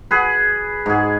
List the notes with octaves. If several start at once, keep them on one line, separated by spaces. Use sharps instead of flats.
G#4 B4
G#2 G#4